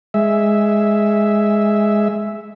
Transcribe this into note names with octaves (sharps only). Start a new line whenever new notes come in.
G#3 E5